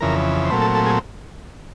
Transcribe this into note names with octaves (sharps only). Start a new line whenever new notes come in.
F2 C#3 E3 A#4
C5
A#2 F#3 A3 C4 B4
A4
A4
G#4